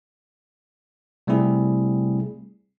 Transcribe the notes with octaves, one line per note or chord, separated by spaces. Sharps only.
C3 G3 A3 C4 E4 G#4